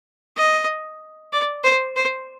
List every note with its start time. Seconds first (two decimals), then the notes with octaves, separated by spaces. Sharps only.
0.36 D#5
1.33 D5
1.64 C5
1.96 C5